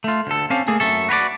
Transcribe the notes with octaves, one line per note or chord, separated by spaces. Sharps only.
A3 F4
D2 A4
C4 C#4 G4 F5 A5
A3 A#3 G#4 A4
F#2 A3 A4
F#4 B4 C#5 D5